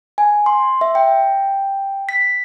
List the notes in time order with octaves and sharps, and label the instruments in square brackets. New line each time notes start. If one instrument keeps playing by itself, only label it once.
[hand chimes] G#5
C6
E5
G5
B6